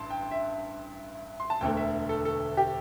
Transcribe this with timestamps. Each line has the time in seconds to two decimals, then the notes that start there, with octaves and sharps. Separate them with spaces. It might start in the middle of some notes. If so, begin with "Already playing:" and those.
Already playing: A1 G2 A5 C6
0.10 G5
0.31 E5
1.40 C6
1.50 A5
1.61 E1 D2 D3 A3 G5
1.77 E5
2.09 A4
2.25 A4
2.57 G4